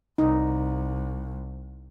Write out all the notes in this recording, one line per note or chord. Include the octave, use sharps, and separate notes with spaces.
C2 D#4